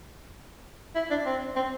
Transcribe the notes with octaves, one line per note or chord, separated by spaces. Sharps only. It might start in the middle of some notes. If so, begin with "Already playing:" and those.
E4
D4
C4
C4